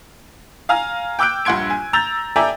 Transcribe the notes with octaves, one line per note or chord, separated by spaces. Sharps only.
F5 G#5 A#5 F6
G5 D6 E6 F#6 G6 D7
A#1 G2 F#5 C6 G#6 D7
G#5
A#5 E6 G6 A6 F7
A4 D5 E5 G5 G#5 A#5